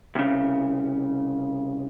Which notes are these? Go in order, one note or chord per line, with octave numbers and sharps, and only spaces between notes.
C2 C#3